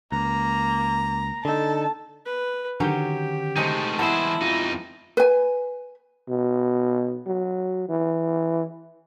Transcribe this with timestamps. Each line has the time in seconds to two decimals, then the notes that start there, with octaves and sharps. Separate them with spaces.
0.12 C#2 A#3 A#5
1.45 D3 D#4 A4 A5
2.26 B4
2.80 D3 D#3 F#3 C#4 G4 G6
3.56 C3 G#3 A3 D#4
3.99 E3 B3 E4 G#4 C5 A5
4.42 F2 D#4 F4
5.17 B4 G#5
6.29 B2
7.27 F#3
7.89 E3